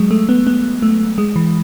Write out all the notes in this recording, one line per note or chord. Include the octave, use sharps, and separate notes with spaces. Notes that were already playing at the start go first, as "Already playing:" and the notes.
Already playing: F#3 G#3
A3
B3
B3
A3
G#3
E3